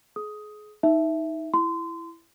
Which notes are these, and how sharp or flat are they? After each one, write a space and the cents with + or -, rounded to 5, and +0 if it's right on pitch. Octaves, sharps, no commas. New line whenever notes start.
G#4 +30 D#6 +10
D#4 +20 E5 +0
E4 +10 C6 -25